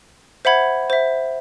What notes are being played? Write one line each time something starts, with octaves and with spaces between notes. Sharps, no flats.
C5 E5 F#5 B5 G#6
C5 E5